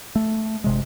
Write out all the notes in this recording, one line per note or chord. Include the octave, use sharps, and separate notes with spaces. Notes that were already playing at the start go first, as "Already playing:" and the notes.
A3
G1 C3 G#3